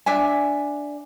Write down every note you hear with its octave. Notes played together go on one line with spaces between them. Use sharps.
D4 E5 G#5